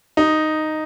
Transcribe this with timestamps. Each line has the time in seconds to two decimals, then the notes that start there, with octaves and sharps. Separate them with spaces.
0.17 D#4